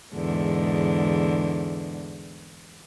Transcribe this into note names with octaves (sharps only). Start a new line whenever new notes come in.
E2 G#2 D3